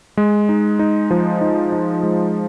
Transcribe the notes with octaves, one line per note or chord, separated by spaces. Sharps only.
G#3
D#4
D#4
F3
D#4
D#4
G#3